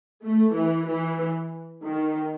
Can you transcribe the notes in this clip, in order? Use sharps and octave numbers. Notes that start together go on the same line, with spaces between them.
A3
E3
E3
D#3